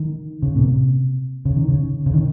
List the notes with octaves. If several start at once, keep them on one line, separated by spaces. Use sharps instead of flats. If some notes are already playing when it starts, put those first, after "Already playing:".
Already playing: D#3
C#3
A#2
C3
C#3
D#3
C#3
C#3
D#3